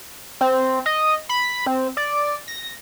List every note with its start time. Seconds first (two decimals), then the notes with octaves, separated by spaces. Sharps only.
0.41 C4
0.86 D#5
1.29 B5
1.66 C4
1.97 D5
2.48 A#6